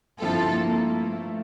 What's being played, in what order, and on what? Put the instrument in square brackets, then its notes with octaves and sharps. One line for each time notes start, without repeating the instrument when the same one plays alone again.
[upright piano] G2 F3 C4 E4 [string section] F4 A4
[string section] A#3
A3